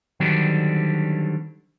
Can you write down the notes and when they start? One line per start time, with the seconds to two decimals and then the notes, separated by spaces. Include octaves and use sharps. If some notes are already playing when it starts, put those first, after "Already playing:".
0.20 D3 D#3 F#3 G3 C4 D4